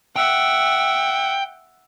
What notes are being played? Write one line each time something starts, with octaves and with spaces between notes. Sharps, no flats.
E5 F#5 G5